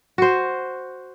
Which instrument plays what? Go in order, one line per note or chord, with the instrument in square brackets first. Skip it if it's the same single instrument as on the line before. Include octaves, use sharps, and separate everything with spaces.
[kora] F#4 C5